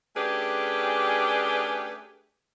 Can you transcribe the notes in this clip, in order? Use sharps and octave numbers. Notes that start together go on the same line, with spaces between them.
A3 C#4 D4 G4 G#4 B4